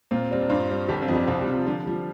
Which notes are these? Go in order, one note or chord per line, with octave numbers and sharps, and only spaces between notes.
A#2 C4 F4
G3 C4
D4
G2 C4 F4
G3
G1 D4 G4
C4 F4
F2
D4 G4
C2 C4 F4
G3
C3
F3
D3 F3
F3 G3